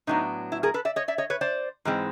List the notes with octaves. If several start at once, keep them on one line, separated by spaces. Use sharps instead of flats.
A2 F#3 B3 D4 D#4
E4
G#4 A#4
A4 B4
D5 E5
C#5 D#5
D5 E5
C#5 D#5
B4 C#5
C5 D5
G#2 E3 G#3 C4